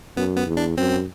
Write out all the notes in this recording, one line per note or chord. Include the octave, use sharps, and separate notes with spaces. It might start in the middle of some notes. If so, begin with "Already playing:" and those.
F#2 B3
B3
E2
D4
F#2 C4